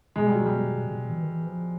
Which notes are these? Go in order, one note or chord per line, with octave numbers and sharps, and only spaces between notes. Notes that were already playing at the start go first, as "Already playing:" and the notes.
B2 G#3
G3
F#3
G3
B2
E3
D#3
E3
F3